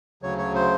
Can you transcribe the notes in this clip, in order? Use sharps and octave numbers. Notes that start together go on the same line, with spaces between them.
D2 C#3 F#3 C#5
C#5
C5